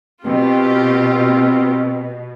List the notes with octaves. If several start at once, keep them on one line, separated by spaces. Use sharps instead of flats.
B2 C4 F4 G4